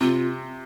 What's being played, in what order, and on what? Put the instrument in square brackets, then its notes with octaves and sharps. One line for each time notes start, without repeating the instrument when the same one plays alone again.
[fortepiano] C3 [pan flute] F4